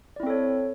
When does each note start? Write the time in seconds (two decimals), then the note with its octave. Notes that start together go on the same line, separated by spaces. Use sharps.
0.16 D5
0.20 E4
0.23 C4
0.27 A4
0.30 C#5